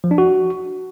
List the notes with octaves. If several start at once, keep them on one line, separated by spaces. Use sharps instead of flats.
F3
D4
F#4